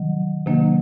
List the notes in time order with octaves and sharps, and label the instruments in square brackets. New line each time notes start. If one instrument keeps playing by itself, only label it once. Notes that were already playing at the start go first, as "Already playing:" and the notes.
Already playing: [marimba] C3 D#3 F#3
C3 D#3 F#3 A#3 D4